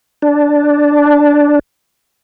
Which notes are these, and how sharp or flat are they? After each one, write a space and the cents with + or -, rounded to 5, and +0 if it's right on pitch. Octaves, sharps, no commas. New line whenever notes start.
D4 -5